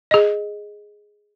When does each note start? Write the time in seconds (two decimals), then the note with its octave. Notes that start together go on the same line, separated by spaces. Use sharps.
0.11 G#4 D#5